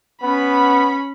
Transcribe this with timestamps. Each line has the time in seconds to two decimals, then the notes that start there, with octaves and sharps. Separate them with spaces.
0.22 B3 C#4 B5